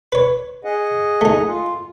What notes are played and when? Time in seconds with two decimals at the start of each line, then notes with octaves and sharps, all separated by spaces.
0.12 B4 C#5
0.64 G#4 D#5 F#5
1.21 A3 D#4
1.48 F4